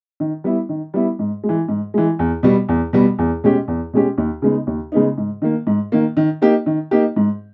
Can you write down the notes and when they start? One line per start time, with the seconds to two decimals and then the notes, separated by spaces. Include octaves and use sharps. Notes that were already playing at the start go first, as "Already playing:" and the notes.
0.20 D#3
0.44 G3 B3 E4
0.69 D#3
0.94 G3 B3 E4
1.19 G#2
1.43 G#3
1.49 E3
1.68 G#2
1.94 E3 G#3
2.19 E2
2.43 B2 G3 B3
2.69 E2
2.93 B2 G3 B3
3.19 E2
3.44 B2 G#3 C#4 G4
3.68 E2
3.93 B2 G#3 C#4 G4
4.18 D#2
4.42 C#3 G#3 B3 D#4
4.67 D#2
4.92 C#3 G#3 B3 D#4
5.18 G#2
5.42 D#3 A#3
5.67 G#2
5.92 D#3 A#3
6.17 D#3
6.42 A#3 D#4 G4
6.66 D#3
6.91 A#3 D#4 G4
7.16 G#2